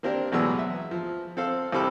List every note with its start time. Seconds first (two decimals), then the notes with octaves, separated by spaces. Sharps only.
0.03 A#3 C4 D4 G4 A#4
0.32 A1 B2 F#3 G#3 B3 E6
0.59 E5
0.91 F3
1.37 C4 A4 F5
1.72 C2 C4 G4 A4 B5 D6